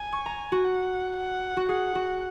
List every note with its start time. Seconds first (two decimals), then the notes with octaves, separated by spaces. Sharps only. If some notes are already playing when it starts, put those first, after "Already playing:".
Already playing: G#5
0.13 C#6
0.26 A#5
0.52 F#4
0.65 F#5
1.16 F#5
1.57 F#4
1.69 G#4 F#5
1.95 F#4